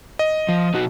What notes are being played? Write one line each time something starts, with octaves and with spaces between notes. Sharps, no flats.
D#5
F3
B2 D#4 F#4